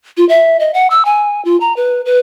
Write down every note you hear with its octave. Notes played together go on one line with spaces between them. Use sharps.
F4
E5
D#5
F#5
E6
G#5
F4
A#5
B4
B4